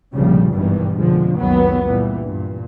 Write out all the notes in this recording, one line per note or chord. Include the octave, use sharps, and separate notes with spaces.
F1 A#1 A#2 C#3 F3 G3
G#1 G2 B2 D#3 E3 G3
F1 B2 D3 F3 G#3
F#1 C#2 D#3 F#3 B3
A#2 E3 G3
G2 A#2